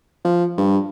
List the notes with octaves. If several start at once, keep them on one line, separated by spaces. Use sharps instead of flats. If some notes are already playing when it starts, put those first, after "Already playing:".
F3
G2